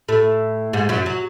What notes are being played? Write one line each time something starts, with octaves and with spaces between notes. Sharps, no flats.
A2 A3
G#2 G#3
F#2 F#3
F#3